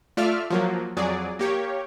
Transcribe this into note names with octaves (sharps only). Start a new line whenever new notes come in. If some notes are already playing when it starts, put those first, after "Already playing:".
A3 F4 D5 E5 F6
F3 F#3 A#3
F2 F#3 G#4 D5
A#3 G4 C#5